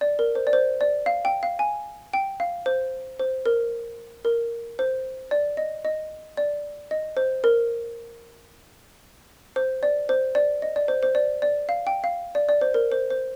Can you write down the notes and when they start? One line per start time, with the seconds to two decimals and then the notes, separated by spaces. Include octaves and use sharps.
0.01 D5
0.19 A#4
0.35 C5
0.47 D5
0.53 C5
0.81 D5
1.06 F5
1.25 G5
1.43 F5
1.59 G#5
2.13 G5
2.40 F5
2.66 C5
3.19 C5
3.46 A#4
4.25 A#4
4.79 C5
5.31 D5
5.57 D#5
5.85 D#5
6.37 D5
6.91 D#5
7.17 C5
7.44 A#4
9.56 C5
9.83 D5
10.09 C5
10.35 D5
10.62 D#5
10.76 D5
10.88 C5
11.03 C5
11.15 D5
11.42 D5
11.69 F5
11.87 G5
12.04 F5
12.35 D5
12.49 D5
12.61 C5
12.74 A#4
12.92 C5
13.10 C5